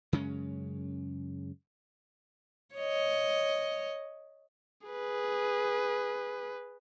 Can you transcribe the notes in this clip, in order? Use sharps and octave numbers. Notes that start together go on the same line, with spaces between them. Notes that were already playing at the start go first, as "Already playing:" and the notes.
F#2 C#3 G#3 C#4
C#5 D#5
G#4 B4